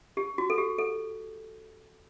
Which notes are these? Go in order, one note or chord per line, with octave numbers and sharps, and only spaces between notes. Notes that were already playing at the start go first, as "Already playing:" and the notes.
G4
F#4
A4
G4
A4